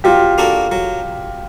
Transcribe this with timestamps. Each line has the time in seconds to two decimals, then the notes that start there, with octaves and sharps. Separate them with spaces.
0.04 F#3 F4 G4
0.38 A#3 D4 F#4 A4
0.72 F#3